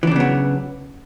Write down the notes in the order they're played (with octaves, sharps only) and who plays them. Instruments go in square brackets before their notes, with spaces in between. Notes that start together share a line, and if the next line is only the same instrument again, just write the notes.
[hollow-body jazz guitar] E3
D4
C#3
B3
F#3